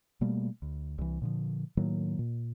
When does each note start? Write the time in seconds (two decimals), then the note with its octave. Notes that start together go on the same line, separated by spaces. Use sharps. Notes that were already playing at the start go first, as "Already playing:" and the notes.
0.21 B2 G3 A3 A#3
0.62 D2
0.98 C2 E3
1.22 A#2 D3 F3
1.77 A2 D#3 F#3 A#3
2.19 A#2